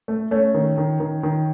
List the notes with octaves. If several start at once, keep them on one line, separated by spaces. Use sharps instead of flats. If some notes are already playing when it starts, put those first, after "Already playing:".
A3
A3 C#4
D#3
D#3
D#3
D#3